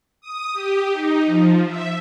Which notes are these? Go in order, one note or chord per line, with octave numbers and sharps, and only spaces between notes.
D#6
G4
D#4
F3
E5